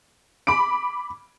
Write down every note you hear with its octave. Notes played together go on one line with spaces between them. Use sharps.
B5 D6 D7